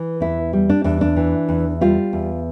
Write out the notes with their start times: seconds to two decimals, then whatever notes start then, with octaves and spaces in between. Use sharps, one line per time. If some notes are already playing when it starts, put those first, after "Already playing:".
Already playing: E3
0.20 E2 E4
0.53 G3
0.69 D4
0.84 E2 D4
1.01 D4
1.16 E3
1.49 E2
1.81 G3 F4
2.13 E2